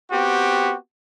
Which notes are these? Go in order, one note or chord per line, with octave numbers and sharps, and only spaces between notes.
B3 C4 F#4 G4